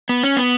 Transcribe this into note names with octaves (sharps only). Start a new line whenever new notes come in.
B3
C#4
B3